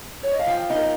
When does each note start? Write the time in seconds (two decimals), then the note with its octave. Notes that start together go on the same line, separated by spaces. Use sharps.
0.23 C#5
0.31 D#5
0.39 F5
0.47 F3 G5
0.70 D#4
0.76 A#4